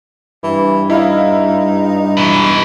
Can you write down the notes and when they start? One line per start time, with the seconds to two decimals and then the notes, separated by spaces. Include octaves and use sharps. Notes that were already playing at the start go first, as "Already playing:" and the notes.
0.44 G2 E3
0.90 D#4 E4 E5 F5
2.17 B2 E3